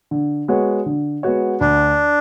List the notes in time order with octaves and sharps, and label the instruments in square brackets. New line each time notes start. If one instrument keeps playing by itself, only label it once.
[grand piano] D3
G#3 B3 F#4 C#5
D3
G#3 B3 F#4 C#5
[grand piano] D2 [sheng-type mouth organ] D4